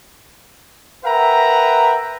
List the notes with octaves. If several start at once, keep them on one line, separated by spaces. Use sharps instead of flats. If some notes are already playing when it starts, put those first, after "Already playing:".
A#4 B4 E5 F#5 G5 A#5